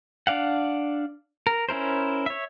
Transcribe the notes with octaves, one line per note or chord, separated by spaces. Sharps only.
D4 D5 F5 F#5
A#4
C#4 E4 A#4 C5
C#5 E5